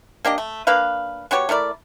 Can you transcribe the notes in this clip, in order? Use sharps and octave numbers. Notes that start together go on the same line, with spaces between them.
A#3 D4 G4 D#5
A3
A#3 D4 B4 F5
B3 F#4 G4 C#5
A3 E4 A#4 D5